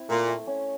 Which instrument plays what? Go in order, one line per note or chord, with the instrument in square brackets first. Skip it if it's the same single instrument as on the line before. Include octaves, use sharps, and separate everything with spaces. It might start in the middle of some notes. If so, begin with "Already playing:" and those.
Already playing: [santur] C4 E4
[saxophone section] A#2 [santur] A3
[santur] A3
C#4